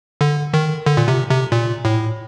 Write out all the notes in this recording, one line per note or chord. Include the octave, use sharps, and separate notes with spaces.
D3
D#3
D3
A#2
C3
C3
A#2
A2